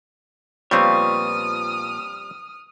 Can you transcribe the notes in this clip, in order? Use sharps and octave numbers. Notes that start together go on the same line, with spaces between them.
A#2 F3 G3 B3 C4 C#5 D#6 F6